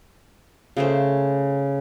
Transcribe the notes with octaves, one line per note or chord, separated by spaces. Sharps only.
C#3 A3 C5